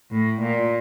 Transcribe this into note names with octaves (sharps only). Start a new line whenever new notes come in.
A2
A#2